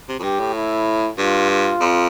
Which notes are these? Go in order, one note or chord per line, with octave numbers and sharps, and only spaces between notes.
C3
F2
G2 G4
A2
E4
G2 F4
F4
F2